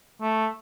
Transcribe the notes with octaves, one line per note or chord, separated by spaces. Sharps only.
A3